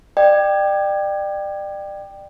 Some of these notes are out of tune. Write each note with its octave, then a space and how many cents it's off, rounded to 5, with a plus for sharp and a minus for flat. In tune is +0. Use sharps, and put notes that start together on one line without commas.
D5 +30 G5 +0